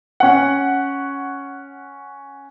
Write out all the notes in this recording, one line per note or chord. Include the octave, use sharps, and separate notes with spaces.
C#4 F#5